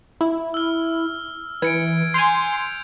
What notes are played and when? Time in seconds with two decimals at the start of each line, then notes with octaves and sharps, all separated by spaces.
0.21 E4
0.54 E6 F6
1.62 E3 G#6 C#7 D7
2.14 G#5 C6 G6 F7